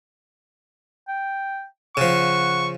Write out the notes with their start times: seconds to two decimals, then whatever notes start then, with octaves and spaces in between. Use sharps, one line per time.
1.08 G5
1.97 C#3 F3 F#5 C#6